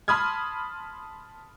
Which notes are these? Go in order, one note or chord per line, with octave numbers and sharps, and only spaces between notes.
A5 B5 C6 D#6 F6 G#6